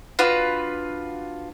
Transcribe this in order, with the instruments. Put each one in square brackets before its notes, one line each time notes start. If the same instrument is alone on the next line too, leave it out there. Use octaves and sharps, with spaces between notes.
[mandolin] D4 F4 F#4 B4